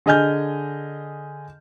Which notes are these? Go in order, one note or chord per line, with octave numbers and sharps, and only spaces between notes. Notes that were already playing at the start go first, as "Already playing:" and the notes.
D3 G#4 D#5 G#5 F6 G6